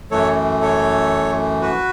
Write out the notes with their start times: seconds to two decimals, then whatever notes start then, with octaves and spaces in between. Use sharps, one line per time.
0.11 F#2 E3 A3 A4 C#5
0.61 A4 C#5
1.62 F#4 B4